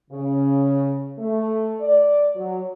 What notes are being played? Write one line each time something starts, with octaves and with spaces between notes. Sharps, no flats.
C#3
A3
D5
F#3